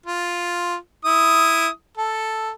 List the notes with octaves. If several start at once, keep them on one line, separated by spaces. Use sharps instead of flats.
F4
E4 D#6
A4